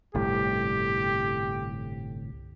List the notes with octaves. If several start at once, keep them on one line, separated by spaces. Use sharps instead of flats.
G1 C2 A2 G4